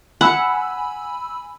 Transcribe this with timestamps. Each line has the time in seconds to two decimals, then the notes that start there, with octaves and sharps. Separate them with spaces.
0.21 F#5 G#5 B5 E6